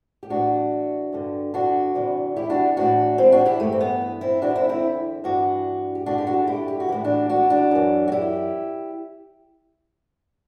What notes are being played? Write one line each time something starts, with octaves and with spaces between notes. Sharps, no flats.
G4
A2 E3 D4 F#4
G2 D3
D4 F#4
E2 C3 E3
E4 G4
D4 F#4
A2 E3 D4 F#4
C4 E4
D4 F#4
E4 G4
G2 E3 A3
C4
B3
C4 E4
E2 D3 D4 F#4
C4 E4
C4 E4
G2 E3 D4 F#4
G4
G2 D3 D4 F#4
G4
D4 F#4
E4 G4
G4
F#4
A2 E3 E4
D4 F#4
D4 F#4
D4 F#4
F#2 E3
F#4
E4 G4